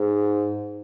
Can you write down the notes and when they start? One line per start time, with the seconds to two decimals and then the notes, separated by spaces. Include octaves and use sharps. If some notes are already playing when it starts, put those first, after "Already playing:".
Already playing: G#2